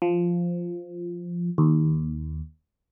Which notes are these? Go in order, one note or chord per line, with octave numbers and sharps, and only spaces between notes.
F3
D#2